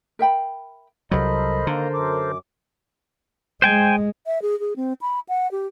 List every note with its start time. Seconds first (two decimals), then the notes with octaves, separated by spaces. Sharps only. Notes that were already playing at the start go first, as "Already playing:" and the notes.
0.19 A#4 E5 G5 B5
1.11 C2 F#3 A4 A#4 C5 D#5 B5
1.67 D3 D#3 A#3 A#5
1.94 F#2 D6
3.62 G#3 C5 G5 G#5
4.26 E5
4.42 G#4
4.60 G#4
4.76 C4
5.01 B5
5.29 F#5
5.51 G4